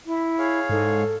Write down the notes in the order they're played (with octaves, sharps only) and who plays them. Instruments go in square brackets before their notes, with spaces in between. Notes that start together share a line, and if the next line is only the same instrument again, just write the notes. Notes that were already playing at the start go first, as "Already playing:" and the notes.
[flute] E4
[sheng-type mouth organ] G#4 C#5 F5
[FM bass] G#2 [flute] A4